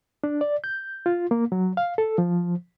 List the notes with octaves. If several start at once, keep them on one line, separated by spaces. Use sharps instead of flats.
D4
D5
G6
F4
A#3
F#3
F5
A4
F3